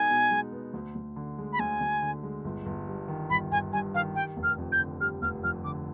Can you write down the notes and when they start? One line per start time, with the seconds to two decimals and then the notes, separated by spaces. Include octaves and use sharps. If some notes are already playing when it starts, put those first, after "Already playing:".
Already playing: B2 G#3 B3 D#4 G#5
0.10 B2
0.31 G#3
0.52 B3
0.74 D2
0.95 D2
1.16 D3
1.38 G#3
1.53 B5
1.59 D2 G#5
1.81 D2
2.02 D3
2.23 G#3
2.45 G1
2.66 G1
2.88 G2
3.08 D#3
3.30 G1 B5
3.51 G1 G#5
3.73 G2 G#5
3.94 D#3 F5
4.15 G3 G5
4.37 F1
4.43 F6
4.58 F2
4.72 G6
4.79 D3
5.01 G3 F6
5.22 F1 F6
5.44 F2 F6
5.64 D3 D6